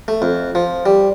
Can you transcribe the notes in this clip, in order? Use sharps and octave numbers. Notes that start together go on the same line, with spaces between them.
A3
F2
F3
G3